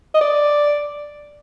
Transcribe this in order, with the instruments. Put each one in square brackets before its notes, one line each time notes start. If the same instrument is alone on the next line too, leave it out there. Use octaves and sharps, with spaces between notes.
[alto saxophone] D#5
D5